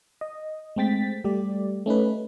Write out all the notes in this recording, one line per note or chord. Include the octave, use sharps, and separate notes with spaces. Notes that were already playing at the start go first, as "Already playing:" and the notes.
D#5
G#3 A3 C4 G5 A6 B6
G3 A3 G4 D5
A3 C#4 D#4 B4